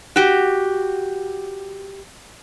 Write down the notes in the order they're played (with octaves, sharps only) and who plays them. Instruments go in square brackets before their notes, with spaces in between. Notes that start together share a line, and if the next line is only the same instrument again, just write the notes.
[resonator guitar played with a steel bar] F#4 G4